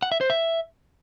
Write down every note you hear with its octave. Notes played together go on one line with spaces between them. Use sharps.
F#5
E5
C5
E5